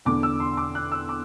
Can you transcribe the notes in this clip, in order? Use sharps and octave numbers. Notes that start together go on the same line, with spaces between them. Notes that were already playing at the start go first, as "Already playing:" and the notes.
E2 D3 D6
E6
C6
D6
F#6
E6
D6